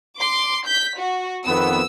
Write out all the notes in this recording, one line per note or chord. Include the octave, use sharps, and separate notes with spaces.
C6 D6
G6 B6
F#4
F2 D#3 B3 E6